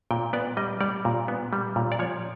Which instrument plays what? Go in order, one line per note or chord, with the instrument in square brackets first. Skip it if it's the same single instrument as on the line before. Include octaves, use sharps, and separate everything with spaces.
[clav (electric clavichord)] A#2 G5
B3 D5
G3 D#5
G3 D5
A#2
B3
G3
A#2
D5
F3 C#5